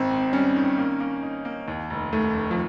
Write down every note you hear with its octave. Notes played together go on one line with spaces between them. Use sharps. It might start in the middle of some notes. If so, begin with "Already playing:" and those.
Already playing: G#1 C4
G#2
G3 C#4
D#3
A#3
A#3
D#4
A#3
D#2
F1
D#2 A3
F1
F3